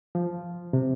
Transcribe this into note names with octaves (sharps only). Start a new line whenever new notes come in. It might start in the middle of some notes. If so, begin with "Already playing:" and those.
F3
C3